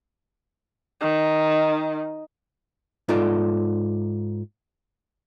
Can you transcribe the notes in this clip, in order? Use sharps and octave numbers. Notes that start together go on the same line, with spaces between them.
D#3
G#2 D#4 F4 A4 D5